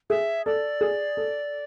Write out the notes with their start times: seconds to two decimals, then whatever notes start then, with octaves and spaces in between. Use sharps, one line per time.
0.10 G#4 E5
0.46 A4 D5
0.81 G#4
1.17 A4